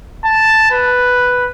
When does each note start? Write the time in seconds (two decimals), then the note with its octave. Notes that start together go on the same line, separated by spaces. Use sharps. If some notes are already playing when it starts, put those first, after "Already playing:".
0.25 A5
0.71 B4